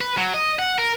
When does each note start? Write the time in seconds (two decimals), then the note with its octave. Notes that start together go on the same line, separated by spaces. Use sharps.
0.01 B4
0.18 F#3
0.34 D#5
0.59 F#5
0.79 A#4